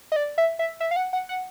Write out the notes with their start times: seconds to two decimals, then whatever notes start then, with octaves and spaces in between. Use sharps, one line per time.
0.12 D#5
0.16 D5
0.38 E5
0.59 E5
0.80 E5
0.91 F5
0.96 F#5
1.13 F#5
1.29 F#5